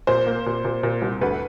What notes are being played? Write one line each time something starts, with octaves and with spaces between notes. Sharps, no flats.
A#2 C5
A#3
A#2
A#2
A#2
C2
D2 B4